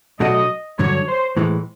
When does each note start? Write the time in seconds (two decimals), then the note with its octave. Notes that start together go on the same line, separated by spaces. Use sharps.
0.20 B2 F#3 A3 D4 F#4 D#5
0.79 G2 D3 F#3 C#5
1.07 C5
1.37 A2 E3 G#3